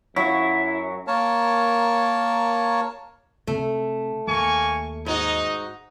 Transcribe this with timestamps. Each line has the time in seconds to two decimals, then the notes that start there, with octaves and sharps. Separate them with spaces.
0.16 F#2 F#3 E4
1.07 A#3 A#4 C#5 A5
3.47 C3 A3
4.27 D#2 A#3 G#5 C#6
5.06 G#2 D#4 F#4